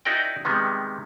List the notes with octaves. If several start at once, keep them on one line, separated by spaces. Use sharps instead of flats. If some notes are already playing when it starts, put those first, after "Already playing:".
D#4 E4 F#4 A#4 D5 G5
C3 D#3 G3 G#3 B3